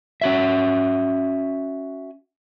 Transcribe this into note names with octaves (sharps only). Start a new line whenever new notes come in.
C#4 F#4 E5